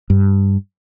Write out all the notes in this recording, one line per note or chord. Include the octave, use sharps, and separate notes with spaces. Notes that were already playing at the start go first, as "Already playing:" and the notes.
G2